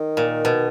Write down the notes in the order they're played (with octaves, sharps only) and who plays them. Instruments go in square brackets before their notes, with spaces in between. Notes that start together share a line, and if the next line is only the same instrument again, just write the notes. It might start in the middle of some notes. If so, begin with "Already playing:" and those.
Already playing: [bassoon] D#3
[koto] A#2
B2